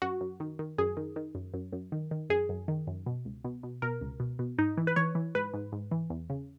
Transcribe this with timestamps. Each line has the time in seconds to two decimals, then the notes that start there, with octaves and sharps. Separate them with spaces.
0.02 F#2 F#4
0.21 F#2
0.40 D#3
0.59 D#3
0.78 F#2 G#4
0.97 D#3
1.16 D#3
1.35 F#2
1.54 F#2
1.73 F#2
1.92 D#3
2.11 D#3
2.30 F#2 G#4
2.49 F#2
2.68 D#3
2.87 F#2
3.06 B2
3.25 C#2
3.44 B2
3.63 B2
3.82 B2 A#4
4.01 C#2
4.20 B2
4.39 B2
4.58 G#2 D#4
4.77 E3
4.87 B4
4.96 E3 C#5
5.15 E3
5.35 G#2 B4
5.54 G#2
5.72 G#2
5.91 E3
6.10 E2
6.30 C#3